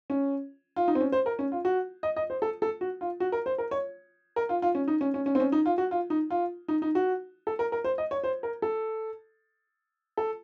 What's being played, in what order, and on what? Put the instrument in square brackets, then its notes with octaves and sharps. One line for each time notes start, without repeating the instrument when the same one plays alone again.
[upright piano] C#4
F4
D#4
C4
C#4
C5
A#4
C#4
F4
F#4
D#5
D#5
C5
A4
A4
F#4
F4
F#4
A#4
C5
A#4
C#5
A#4
F4
F4
C#4
D#4
C#4
C#4
C#4
C4
C#4
D#4
F4
F#4
F4
D#4
F4
D#4
D#4
F#4
A4
A#4
A#4
C5
D#5
C#5
C5
A#4
A4
A4